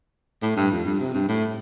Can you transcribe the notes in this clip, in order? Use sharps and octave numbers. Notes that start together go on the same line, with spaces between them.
A2
G2
F2
G2
C3
G2
A2